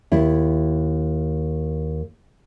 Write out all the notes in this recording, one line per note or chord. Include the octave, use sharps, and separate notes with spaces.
D#2 E4